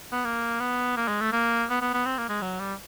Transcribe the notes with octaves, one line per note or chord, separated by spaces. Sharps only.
B3
A#3
B3
A#3
G#3
A3
A#3
B3
B3
B3
C4
A#3
G#3
F#3
G3